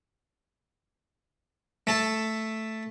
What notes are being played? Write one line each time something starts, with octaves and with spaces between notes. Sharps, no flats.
A3 A4 A5